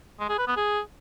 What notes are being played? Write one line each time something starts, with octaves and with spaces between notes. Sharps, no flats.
G#3
G#4
B4
B3
G#4